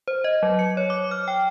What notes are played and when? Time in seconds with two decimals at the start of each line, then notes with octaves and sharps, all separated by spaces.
0.08 C5
0.24 D#5
0.43 F#3
0.59 C#7
0.77 C#5
0.90 D6
1.11 F6
1.28 G5